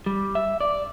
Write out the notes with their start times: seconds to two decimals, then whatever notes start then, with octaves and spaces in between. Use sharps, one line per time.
0.06 G3
0.35 E5
0.61 D5